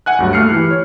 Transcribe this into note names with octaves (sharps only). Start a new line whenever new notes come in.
F#5 G#5 F#6
D2 G2 F#3
A3 A#3 F6 C7 C#7
E3 E4 G4 F#6
C#5